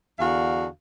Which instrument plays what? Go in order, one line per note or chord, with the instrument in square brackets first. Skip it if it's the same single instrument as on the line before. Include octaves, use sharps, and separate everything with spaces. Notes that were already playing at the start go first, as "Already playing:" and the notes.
[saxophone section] E2 D3 D4 F#4 F5